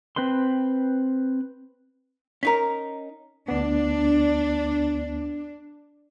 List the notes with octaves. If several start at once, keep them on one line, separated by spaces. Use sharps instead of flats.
C4 B4 C5 C6
C#4 D#4 A#4 A#5 B6
D2 B3 D4